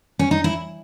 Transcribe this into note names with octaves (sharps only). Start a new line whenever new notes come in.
C#4
D#4
E4